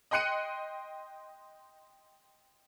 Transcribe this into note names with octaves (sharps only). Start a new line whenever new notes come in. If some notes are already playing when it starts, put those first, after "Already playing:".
D#5 G5 C6 F#6 C#7 D#7